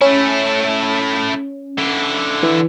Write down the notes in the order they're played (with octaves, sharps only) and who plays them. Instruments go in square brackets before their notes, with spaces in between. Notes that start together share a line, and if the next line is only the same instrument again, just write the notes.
[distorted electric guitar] A3 E4 [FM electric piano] C#4
[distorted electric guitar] D3 E4
[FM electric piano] E3